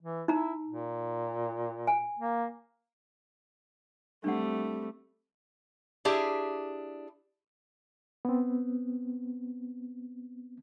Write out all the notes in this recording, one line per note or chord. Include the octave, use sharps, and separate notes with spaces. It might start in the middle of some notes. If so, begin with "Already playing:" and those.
E3
D#4 E4 A#5
A#2
G#5
A#3
G3 A3 C4 D4 F#5
D4 E4 G4 G#4 E5
B3 C4